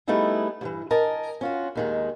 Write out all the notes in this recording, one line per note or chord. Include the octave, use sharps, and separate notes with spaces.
G3 A3 B3 D#4 E4 G#4
D2 G2 E3
A#4 D#5 G#5 A5
C#4 F4 F#4
D#2 D#3 G#3